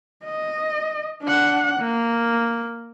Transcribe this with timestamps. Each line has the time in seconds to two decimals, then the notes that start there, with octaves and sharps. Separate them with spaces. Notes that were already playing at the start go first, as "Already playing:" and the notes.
0.24 D#5
1.23 D4 F#5
1.80 A#3